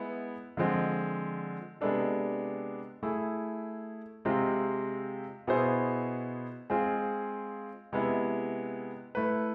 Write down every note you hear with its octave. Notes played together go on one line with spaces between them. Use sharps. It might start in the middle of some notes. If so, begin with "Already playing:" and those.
Already playing: G#3 B3 E4
D3 F3 G#3 C4
C3 G#3 B3 D4 A4
A3 E4 G#4
C3 G#3 C4 F4
B2 B3 E4 G#4 C5
G#3 C4 F4 G#4
C3 G#3 B3 E4
A3 E4 B4